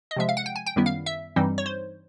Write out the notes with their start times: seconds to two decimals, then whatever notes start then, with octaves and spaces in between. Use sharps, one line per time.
0.11 D#5
0.16 C3 F3 G#3 E5
0.29 F5
0.37 F#5
0.46 G5
0.56 G#5
0.66 G5
0.76 F#2 D#3 G3 B3 E4
0.86 F5
1.06 E5
1.36 G2 E3 G3 C4 D#4
1.58 C#5
1.66 C5